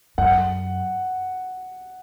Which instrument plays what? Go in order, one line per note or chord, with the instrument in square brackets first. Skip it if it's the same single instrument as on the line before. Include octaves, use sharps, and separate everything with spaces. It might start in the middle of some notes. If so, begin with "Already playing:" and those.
[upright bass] F#2 [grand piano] F#5